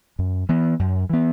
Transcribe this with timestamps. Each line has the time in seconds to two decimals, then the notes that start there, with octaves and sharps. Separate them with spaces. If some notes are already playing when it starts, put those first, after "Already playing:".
0.19 F#2
0.49 E3 B3
0.79 F#2
1.10 E3 B3